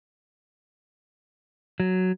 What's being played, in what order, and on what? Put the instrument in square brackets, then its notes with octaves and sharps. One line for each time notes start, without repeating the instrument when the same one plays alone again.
[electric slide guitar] F#3